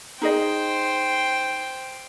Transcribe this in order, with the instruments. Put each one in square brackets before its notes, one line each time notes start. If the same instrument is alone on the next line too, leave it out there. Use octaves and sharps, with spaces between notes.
[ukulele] D#4 G#4 D#5 [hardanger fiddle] C5 G5